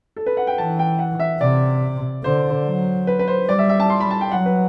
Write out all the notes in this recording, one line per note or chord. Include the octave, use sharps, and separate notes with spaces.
A4
B4
F#5
G5
E3 A5
G5
F#5
E5
C3 D5
D3 C5
F#3
B4
B4
C5
G3 D5
E5
E5
A5
C6
B5
A5
G5
F#3 F#5
B4